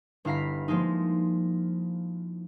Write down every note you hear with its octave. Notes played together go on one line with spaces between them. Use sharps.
G1 E4 F5 A#5 B6
F3 G#3 A#3 D#4